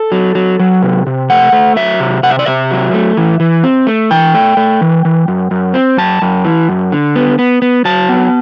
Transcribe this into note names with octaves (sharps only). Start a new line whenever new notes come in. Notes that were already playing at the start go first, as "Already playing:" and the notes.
Already playing: A4
F#3
F#3
F#3
C3
C3
A3 F#5
A3
F#3 E5
C3
C3 F#5
E5
D5
C3 E5
F#3
A3
E3
E3
C4
A3
E3 G5
A3
A3
E3
E3
F#2
F#2
C4
F#2 A5
F#2
E3
F#2
D3
B3
B3
B3
F#3 A5
B3